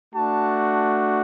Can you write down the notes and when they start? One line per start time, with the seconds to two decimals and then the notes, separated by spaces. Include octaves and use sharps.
0.15 A3 D4 F#4 A5